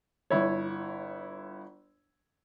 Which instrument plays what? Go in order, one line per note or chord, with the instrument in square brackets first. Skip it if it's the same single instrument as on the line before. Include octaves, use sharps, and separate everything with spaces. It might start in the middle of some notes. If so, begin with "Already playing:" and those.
[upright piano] G1 E4 C#5